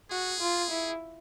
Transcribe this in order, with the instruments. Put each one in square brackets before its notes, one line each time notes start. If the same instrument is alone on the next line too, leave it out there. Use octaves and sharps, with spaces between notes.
[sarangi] F#4 [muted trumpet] G#4
[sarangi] F4
E4